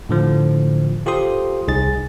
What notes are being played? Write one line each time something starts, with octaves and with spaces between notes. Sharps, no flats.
A2 D3 F3
F4 G4 A4 C5 C6 D#6
C2 D#4 G#4 A6